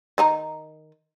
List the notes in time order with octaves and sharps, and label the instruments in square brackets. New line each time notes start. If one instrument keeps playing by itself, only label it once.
[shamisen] D#3 D#4 A#5